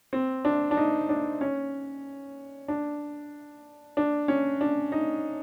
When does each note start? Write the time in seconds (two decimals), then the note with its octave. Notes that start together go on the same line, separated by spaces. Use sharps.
0.13 C4
0.45 D4
0.71 D4
0.77 D#4
1.09 D4
1.41 C#4
2.68 D4
3.97 D4
4.28 C#4
4.61 D4
4.92 D#4